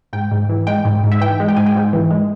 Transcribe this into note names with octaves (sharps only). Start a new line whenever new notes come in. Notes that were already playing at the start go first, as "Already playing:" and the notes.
G#2 G5
G#2
E3
G#3 G5
G#2
G#2
E5
E3 G5
G#3
G5
G#2 G#5
G5
G#2
E3
G#3